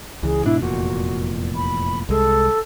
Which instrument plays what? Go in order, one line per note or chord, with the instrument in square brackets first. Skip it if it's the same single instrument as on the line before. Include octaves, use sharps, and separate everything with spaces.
[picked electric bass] C#2 E3 [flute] G#4
[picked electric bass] G#2 B2 D4 [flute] E4
[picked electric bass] F1 E2 A#2 [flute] F#4
[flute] B5
[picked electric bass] C2 G#3 [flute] A4